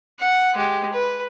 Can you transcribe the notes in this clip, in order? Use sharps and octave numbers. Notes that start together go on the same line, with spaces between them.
F#5
G#3 G4
B4